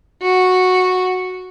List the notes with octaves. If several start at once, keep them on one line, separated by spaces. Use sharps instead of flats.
F#4